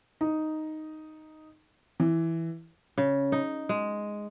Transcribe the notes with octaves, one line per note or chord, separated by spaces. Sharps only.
D#4
E3
C#3
D#4
G#3